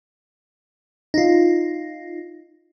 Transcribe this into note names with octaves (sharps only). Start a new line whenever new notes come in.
D#4 F4